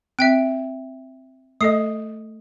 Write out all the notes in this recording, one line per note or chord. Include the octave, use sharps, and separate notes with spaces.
C4 E5 G5 D7
A3 A4 D#5 D#6 C7